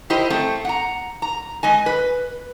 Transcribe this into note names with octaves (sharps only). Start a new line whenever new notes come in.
E4 G4 A#4 C5 D#5
A3 C4
F#5 A#5
A#5
G#3 D#5 G#5
B4